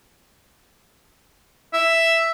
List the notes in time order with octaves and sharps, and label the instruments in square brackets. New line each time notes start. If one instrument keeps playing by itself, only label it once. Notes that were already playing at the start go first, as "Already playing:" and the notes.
[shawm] E5